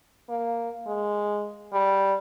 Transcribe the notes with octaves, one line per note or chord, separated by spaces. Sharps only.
A#3
G#3
G3